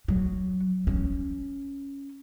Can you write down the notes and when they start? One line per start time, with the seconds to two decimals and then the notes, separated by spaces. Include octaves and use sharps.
0.08 F#3
0.87 C#4